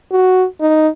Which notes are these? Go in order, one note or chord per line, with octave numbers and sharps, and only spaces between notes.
F#4
D#4